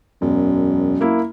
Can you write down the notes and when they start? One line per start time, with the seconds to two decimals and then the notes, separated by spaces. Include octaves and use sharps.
0.22 E1 F#2
1.01 A#3 E4